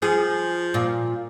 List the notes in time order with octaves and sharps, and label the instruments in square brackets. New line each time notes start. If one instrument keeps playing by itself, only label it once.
[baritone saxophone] F3 [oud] G#4
[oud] A#2